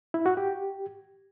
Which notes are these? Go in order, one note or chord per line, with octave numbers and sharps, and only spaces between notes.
E4
F#4
G4